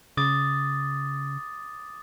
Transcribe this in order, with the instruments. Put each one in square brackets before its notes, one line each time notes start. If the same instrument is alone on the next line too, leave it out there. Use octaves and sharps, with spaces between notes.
[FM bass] C#3 [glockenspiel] D6 D#6 A6